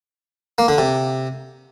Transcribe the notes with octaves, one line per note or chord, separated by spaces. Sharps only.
A#3
D3
C3